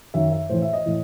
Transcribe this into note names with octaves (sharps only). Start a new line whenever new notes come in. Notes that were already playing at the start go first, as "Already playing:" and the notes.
F#2 D#3 E5
E5
A2 E3 C5
E5
D#5
A2 E3